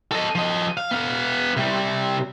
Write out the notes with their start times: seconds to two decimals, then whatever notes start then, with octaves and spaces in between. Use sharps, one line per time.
0.12 A4 D#5
0.35 F3 D#5
0.77 F5
0.91 B3 F5
1.57 C3 G3